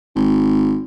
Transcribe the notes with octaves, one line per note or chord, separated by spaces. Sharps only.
G#1